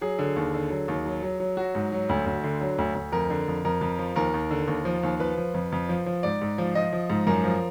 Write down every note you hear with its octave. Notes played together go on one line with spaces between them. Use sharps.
F#3 G#4
D3
D#2
D3
F#3
D#2
F#3
F#3
F#3
F#3 F#4
G#2
F#3
D2
D2
D3
F#3
D2
D2
F2 A#4
D3
F2
F2 A#4
F2
F3
D#2 A#4
D#2
D3
D#2
F3
D#2
F3 B4
F3
F2
F2
F3
F3
G#2 D5
G#2
F3
F3 D#5
F3
G#2
F#2 A#4
F3